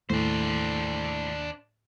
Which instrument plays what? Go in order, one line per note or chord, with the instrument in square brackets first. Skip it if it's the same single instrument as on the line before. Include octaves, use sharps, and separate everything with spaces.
[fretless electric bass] D#2 [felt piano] A2 [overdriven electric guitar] D4 C5